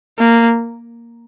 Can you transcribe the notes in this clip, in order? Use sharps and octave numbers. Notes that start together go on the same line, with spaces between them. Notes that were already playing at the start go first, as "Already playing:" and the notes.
A#3